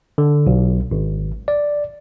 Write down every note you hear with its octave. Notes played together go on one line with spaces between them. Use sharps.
D3
B1
G#1
D5